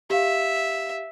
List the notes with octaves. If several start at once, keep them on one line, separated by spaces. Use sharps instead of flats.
G4 E5 F5